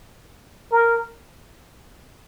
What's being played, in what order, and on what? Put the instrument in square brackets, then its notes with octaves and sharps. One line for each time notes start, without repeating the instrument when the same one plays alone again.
[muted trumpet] A#4